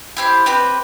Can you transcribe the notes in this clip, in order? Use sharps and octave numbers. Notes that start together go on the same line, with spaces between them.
E4 G4 C5
C4 G4 B4